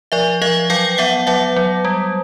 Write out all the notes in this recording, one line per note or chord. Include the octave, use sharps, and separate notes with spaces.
F3 D5 E5
F3 D#5 F5
F#3 F5 G5
B3 E5 F#5
F#3 E5 F#5
F#3
G3